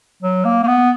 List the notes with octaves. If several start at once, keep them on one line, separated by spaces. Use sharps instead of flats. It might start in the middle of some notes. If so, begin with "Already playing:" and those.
F#3
A#3
A#3
B3